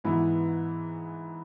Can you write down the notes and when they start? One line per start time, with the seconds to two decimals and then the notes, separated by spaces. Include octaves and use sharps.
0.04 G#2 E3 B3 E4